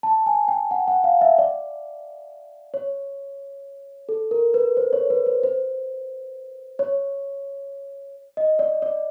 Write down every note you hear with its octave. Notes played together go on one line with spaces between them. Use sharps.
A5
G#5
G5
F#5
F#5
F5
E5
D5
C#5
A4
A#4
B4
C5
C#5
B4
C5
C5
C#5
D#5
D5
D5